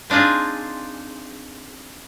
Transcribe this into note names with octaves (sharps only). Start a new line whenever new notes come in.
C4 D4 D#4 F4 G#4